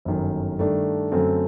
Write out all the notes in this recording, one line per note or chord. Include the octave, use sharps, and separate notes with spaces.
G1 F#2 D#3
G2 D#3 A3 D4
F#2 D3 A3 C4